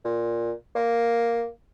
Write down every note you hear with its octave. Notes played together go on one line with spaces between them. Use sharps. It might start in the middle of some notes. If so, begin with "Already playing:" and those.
A#2
A#3